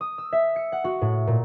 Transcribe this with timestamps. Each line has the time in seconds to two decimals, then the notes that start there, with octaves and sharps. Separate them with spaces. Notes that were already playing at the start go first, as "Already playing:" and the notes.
0.01 D#6
0.18 E6
0.33 E5
0.56 C#7
0.72 F#5
0.84 F#4
1.01 A2
1.27 A#2